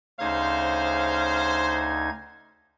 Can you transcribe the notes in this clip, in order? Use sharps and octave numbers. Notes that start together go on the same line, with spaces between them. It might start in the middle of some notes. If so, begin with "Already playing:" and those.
D2 C#3 D#4 C5 F5 G#6